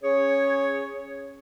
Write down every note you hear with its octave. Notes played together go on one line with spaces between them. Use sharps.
C#4 G#4 C#5